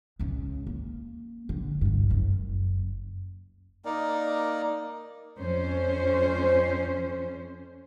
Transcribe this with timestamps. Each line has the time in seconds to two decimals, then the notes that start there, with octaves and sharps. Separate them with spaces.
0.19 C#2 C#3
0.67 A#3
1.49 D3
1.81 C2 G2
2.10 F#1 F#2
3.85 A#3 D#4 A#4 D5
5.38 F2 C#4 C5